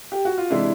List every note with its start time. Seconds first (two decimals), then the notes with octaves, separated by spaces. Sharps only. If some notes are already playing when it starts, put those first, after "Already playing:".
0.12 G4
0.25 F#4
0.38 F4
0.50 C3 E3 G#3 D4 E4